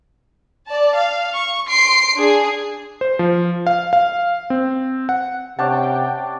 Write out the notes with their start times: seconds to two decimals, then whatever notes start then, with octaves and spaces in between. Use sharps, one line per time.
0.69 D5 A5
0.98 F5
1.36 C#6
1.68 C6 C7 D7
2.15 D4 G#4
3.01 C5
3.19 F3
3.67 F5
3.93 F5
4.50 C4
5.09 F#5
5.59 C3 C#4 D4 F#5 G5 A5